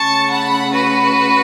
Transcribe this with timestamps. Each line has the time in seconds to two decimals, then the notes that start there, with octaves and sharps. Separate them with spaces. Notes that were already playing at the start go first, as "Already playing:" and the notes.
Already playing: C#3 A3 A5 C#6
0.31 F#5 B5
0.73 F#4 B4